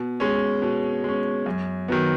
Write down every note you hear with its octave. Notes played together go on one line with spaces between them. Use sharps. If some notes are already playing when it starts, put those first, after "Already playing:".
Already playing: B2
G#3 C#4
B2
G#3 C#4
F#2
D#3 F#3 B3